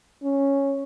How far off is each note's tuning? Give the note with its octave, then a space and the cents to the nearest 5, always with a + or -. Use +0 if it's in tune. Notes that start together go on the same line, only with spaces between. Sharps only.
C#4 -5